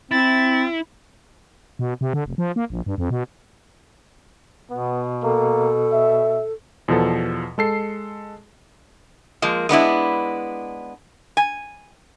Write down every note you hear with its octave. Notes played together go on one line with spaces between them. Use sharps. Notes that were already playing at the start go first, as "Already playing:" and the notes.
C4 E4 A6
B2
C3
D3
F1
F3
A#3
A#1
G2
F2
B2
B2 B3
A#3 A4
E5
E2 B2 F3 A4
G#3 A4 C7
F3 G#3 A#3
G#3 B3 D4 E4
G#5